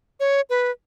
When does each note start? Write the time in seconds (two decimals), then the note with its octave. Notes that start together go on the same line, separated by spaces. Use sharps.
0.20 C#5
0.50 B4